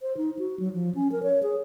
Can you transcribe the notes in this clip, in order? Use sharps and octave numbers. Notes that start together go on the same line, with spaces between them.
C5
D#4
F#4
F#3
F3
C#4
A#4
C#5
G#4